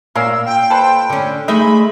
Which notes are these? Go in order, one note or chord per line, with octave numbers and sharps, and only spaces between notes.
A#2 C#4 A#4 F5 E6
G5
A4 B4 C5
D3 C#4
G#3 A3 D#4 D#5 E5 B5